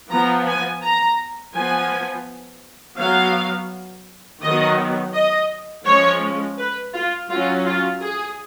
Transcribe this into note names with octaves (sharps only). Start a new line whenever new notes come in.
F3 B3 A#5
G#5
A#5
F3 B3 G#5
F#3 B3 F5
D#3 F#3 B3 D#5
D#5
F3 G#3 C#4 C#5
B4
F4
F#3 C#4 F4
F4
G#4